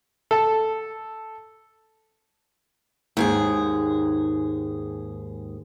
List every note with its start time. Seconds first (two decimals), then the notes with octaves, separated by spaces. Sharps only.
0.31 A4
3.17 D#2 G#2 G#4